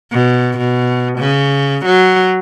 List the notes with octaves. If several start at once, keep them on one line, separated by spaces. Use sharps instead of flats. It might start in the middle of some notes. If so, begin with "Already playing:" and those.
B2
B2
C#3
F#3